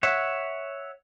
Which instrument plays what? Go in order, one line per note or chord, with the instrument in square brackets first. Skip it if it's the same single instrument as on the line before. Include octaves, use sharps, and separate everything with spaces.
[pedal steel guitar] C#5 E5 F#5